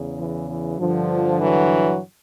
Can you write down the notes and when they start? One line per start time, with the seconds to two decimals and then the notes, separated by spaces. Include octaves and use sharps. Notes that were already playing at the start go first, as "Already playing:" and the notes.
Already playing: E2 C#3
0.19 E3
0.48 E3
0.78 G2 D3 F3
1.40 E3 F#3